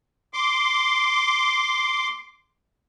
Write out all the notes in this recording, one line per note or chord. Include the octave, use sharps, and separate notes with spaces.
C6 D6